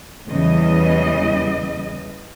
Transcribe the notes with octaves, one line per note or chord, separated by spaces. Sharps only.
E2 C#3 E3 G3 D#5